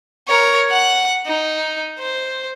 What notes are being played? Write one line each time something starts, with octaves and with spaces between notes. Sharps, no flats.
A#4 C#5
F#5 F#6
D#4
C5